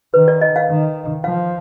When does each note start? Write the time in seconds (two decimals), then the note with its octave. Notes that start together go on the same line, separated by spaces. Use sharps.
0.14 D#3 B4
0.28 D5
0.41 D#5
0.56 F5
0.69 D#3
1.24 F3 F5